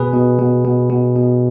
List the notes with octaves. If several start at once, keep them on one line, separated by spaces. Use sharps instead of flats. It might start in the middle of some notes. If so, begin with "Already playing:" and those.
Already playing: B2 G#4 B4
B2
B2
B2
B2
B2